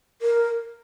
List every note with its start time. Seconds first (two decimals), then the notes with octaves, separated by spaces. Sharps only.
0.22 A#4